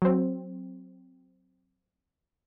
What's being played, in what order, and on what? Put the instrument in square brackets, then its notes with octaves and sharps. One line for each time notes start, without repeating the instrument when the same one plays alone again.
[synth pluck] F#3 C4